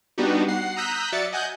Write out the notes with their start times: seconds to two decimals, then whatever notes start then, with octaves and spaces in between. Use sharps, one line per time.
0.18 G3 B3 D4 D#4 F#4 G4
0.48 F#5 C7
0.76 A#5 D#6 E6 F#6 G6 B6
1.12 F#3 D5 E5 A6 C#7
1.32 D#5 F#5 G#5 F#6 G6